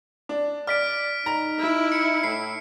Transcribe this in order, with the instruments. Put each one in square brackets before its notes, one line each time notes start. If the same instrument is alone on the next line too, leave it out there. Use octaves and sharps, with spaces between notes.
[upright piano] D4
[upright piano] D5 [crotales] F6 B6 D7
[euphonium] D#4 [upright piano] A#5
[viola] E4
[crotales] C#7
[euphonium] A2 [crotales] C7